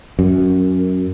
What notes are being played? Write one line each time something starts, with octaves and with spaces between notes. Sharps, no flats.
F#2